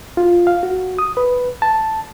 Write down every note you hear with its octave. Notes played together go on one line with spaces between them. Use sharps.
F4
F5
F#4
D#6
B4
A5